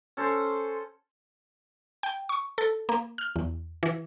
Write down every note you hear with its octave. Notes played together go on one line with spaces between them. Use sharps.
C#4 A4 C5
G5
C#6
A4
A#3
F6
E2
E3